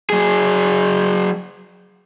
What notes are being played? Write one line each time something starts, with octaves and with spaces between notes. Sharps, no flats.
F#3 G#4